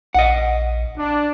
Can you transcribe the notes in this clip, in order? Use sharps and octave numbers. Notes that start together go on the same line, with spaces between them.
A#1 D#5 F#5
D4